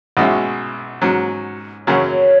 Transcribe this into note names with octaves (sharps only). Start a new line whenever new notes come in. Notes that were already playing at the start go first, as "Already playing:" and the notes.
B1 B2 G#3 C#4 E4
G#2 F#3 C#4
F#2 C#3 F#3 C#5